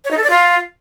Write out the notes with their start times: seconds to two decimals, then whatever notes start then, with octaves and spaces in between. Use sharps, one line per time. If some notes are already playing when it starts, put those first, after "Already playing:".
0.05 C#5
0.11 D#4
0.17 A4
0.24 D5
0.30 F4